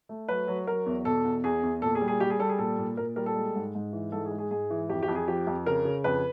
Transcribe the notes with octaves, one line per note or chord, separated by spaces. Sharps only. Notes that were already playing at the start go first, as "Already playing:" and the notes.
A3
F#3 B4
F#3
F#3 A#4
E2
B2 A4
E2
E2 G#4
E2
A#2 A4
G#4
G3
G#4
G3 G4
G#4
G3 A4
G#4
A#2 A4
A#2
A#2 A#4
G3 A#4
A4
G#3
G#2
G#2
E3
G#2 A4
G#4
G#3
G#4
G#2 G#4
E3
F2 G4
G4
F2
G#4
F3 G4
F2
C#3 A#4
C#3
F2 B4